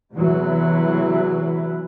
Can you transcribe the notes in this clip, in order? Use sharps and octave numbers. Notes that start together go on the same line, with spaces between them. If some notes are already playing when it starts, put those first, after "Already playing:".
E2 C3 E3 F#3